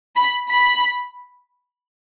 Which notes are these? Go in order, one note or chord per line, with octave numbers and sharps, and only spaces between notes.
B5
B5